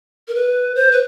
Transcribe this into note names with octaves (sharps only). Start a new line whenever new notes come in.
A#4
B4
C5
B4